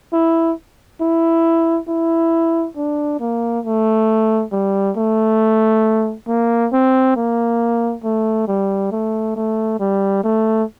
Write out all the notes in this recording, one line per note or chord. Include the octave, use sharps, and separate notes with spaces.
E4
E4
E4
D4
A#3
A3
G3
A3
A#3
C4
A#3
A3
G3
A3
A3
G3
A3